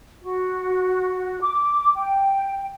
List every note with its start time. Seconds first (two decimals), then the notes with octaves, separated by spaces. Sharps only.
0.22 F#4
1.41 D6
1.96 G5